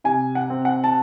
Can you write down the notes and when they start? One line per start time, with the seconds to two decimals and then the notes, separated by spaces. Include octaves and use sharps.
0.04 C3 G#5
0.35 F#5
0.50 C4
0.65 F#5
0.84 A5